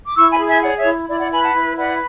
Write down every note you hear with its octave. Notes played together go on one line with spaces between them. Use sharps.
D6
E4 C#6 E6
G#5 B5
G#4
E5 G#5
C#5 D5 F#5
C#5 E5
E4
E4 D5
D5 F#5
B4 G#5 B5
F#5 A5
E4
B4 D5 F#5